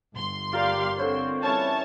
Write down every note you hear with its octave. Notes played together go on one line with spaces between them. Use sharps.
G1 C6
F4 G4 A#4 D5 F5
D3 C4 C5 C#5
E3 G3 C#4 C#5 A5